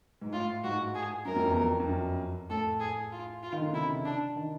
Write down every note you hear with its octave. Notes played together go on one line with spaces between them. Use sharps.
G#2
A2 F4
G#2 F#4
G#4
F#2 A#4
F2
E2
F2
F2
F#2
A2 A4
G#4
F4
F4
D#3
D3
C#3
C3 E4
C#3
D4
D#3